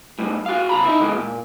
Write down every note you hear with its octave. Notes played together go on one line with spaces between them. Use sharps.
A2 G3
F#4 F5
C#3 A#5 B5
D#4 E4
C#2 E3 G#3
A#2